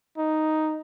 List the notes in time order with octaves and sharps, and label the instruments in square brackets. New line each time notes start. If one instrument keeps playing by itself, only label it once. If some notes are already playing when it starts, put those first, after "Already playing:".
[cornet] D#4